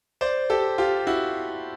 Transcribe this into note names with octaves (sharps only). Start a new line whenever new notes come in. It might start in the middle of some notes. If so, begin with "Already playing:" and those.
C5 D5
G4 A4
F4 G4
E4 F#4